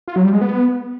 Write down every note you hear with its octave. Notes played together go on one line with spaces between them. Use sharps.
F4
F#3
G3
G#3
B3